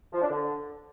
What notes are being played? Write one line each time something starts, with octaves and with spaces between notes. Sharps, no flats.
F3
D4
D3